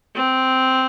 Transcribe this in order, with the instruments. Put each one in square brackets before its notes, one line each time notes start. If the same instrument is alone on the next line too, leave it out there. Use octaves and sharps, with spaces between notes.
[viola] C4